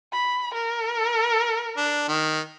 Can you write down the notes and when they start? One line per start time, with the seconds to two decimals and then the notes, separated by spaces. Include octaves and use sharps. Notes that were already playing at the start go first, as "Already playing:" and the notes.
0.13 B5
0.54 A#4
1.77 D4
2.08 D#3